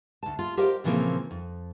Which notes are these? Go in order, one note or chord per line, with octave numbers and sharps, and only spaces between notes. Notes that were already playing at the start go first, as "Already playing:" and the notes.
D2 A5
F4
G4 A#4 C5 D#5 F5
A#2 C#3 E3 F3 A#3 C4
F2